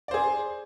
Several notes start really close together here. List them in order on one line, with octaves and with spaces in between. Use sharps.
D5 C5 G#4